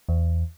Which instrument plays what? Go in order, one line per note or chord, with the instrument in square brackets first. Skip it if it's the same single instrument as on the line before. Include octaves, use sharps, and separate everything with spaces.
[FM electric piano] E2